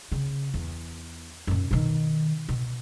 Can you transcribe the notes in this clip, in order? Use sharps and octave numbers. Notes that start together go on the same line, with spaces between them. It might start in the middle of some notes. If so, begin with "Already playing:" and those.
C#3
E2
F#2 A#2
B2 D#3
B2